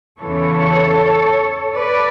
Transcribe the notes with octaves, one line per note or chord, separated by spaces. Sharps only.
E2 C#3 E3 A4 C#5
B4 D5